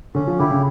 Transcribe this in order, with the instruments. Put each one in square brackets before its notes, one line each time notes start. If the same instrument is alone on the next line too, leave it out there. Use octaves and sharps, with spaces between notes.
[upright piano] D3 [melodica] C#4
[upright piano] F3
[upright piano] D3 [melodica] E4 G4
[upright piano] C#3